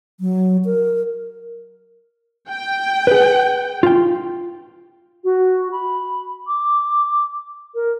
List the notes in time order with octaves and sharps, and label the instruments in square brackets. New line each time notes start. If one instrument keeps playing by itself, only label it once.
[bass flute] F#3
A#4
[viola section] G5
[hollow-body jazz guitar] G#4 B4
F4 G5
[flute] F#4
B5
D6
A#4